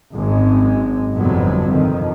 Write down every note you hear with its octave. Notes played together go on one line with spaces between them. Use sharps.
G#1 F#2 G#3
G1 F2 A2 C3 F#3 B3
F2 D#3